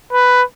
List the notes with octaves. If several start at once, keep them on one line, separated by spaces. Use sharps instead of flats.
B4